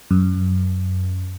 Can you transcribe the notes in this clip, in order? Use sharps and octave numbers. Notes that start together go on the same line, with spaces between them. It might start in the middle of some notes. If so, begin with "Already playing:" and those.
F#2